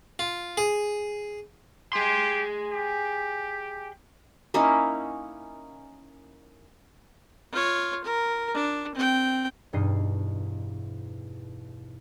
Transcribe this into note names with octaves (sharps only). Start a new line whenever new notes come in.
F4
G#4
G4 G#4 C6
G4
A#3 C#4 D#4 E4
F4 C#5
A#4
D4
C4 G5
E1 G2 D#4 C7